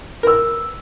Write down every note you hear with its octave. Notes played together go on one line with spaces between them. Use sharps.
A#4 B4 E6